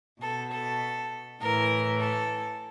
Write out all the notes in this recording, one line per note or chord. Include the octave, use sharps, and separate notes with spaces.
B2 A4
A4
A2 E3 A#4
A4